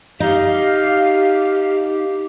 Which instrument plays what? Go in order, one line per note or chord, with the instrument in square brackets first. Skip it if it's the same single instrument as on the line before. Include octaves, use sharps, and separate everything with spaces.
[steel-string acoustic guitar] D#4 [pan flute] G4 [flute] F5